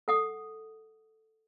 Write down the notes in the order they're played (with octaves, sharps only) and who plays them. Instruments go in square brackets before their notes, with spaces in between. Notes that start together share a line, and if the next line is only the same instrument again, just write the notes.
[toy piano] A4 F#5 D#6